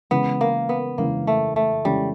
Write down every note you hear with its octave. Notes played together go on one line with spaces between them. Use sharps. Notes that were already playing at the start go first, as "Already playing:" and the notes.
C#3 E3 G#3 B3 C#4
A#3
B3
C#3 E3 G#3 A#3 C#4
A3
A3
C#3 E3 G3 G#3 C#4